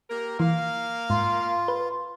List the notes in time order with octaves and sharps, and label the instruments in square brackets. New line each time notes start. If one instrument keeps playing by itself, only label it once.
[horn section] A#3 G4 A#4
[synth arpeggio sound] E3 [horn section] A#3 F5
[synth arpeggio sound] G#2 [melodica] F4
[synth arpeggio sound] B4